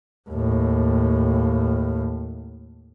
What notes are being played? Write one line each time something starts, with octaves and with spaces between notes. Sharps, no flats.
D#2 A2